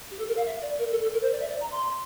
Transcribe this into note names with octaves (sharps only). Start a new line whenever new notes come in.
G4
A4
A#4
F5
E5
D5
A#4
A4
A4
A#4
C5
D5
E5
D5
A#5
C6